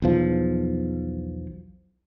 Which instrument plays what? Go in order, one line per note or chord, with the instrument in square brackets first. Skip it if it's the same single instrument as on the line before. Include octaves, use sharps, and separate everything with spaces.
[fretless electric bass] B1 E2 F3